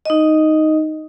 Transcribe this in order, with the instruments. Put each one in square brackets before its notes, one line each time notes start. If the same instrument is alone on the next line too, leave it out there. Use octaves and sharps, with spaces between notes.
[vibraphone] D#4 D#5